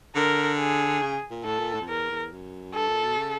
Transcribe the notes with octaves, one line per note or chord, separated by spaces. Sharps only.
D3 A#4
G#4
C#3
A#2
A2 A4
A#2
A2
F2
E2 A#4
E2
F#2
G2 A4
A#2
B2
C#3